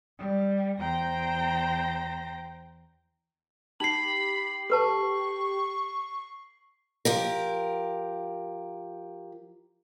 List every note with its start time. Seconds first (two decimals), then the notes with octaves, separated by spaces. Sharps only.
0.18 G3
0.78 E2 C5 G5 A#5 A#6
3.80 D#4 G4 B5 C7 F#7
4.70 A4 B4 A5 C#6
7.05 F3 G4 A#4